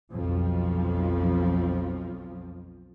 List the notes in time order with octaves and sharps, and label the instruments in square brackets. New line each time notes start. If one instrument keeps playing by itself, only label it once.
[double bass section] B1 F2 F3